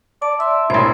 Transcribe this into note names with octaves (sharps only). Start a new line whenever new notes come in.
D5 A5
E5 C6
E1 A1 E4 C5